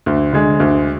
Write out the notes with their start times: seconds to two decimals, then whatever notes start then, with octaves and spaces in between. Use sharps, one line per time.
0.06 D2
0.33 D3 G#3
0.60 D2